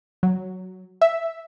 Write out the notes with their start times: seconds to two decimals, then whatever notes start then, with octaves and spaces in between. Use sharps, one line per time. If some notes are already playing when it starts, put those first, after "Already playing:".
0.23 F#3
1.01 E5